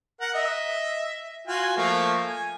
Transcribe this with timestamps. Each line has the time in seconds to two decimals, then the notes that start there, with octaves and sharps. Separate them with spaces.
0.21 A#4 F#5
0.34 D#5 E5
1.47 F4 F#4 G#5
1.77 F3 A3 A#3
2.26 G#5